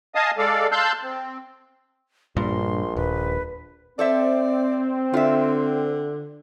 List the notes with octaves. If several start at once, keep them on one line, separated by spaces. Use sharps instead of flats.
D#5 F5 G#5 A5 D#6
G#3 A4 D5 F5
F5 A5 C6 E6 F#6 G6
C4
A#1 G2 A#2 C6
D#1 B4
C4 A4 C5 D5 E5
D3 F4 E5